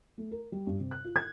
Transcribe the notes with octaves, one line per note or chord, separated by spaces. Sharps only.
A3
A#4
G3
G2
C3
F#6
F4
G#6